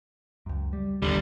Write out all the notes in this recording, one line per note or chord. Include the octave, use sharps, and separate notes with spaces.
C#2 F#2
G3
G#1 D#2 D3 G3